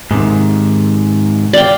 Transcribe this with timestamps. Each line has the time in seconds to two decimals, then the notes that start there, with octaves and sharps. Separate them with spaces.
0.11 G#2 C3 D#3
1.53 D5 F5 G5